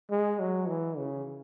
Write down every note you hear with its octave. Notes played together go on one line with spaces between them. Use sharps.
G#3
F#3
E3
C#3